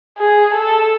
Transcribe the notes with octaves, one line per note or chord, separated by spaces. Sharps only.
G#4
A4